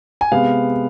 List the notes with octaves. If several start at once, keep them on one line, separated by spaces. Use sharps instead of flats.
G#5
C3 G#3 B3 F5